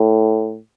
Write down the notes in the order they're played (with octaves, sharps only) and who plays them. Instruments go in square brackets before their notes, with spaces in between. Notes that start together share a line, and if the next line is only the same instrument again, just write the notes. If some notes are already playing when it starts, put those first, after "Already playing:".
Already playing: [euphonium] A2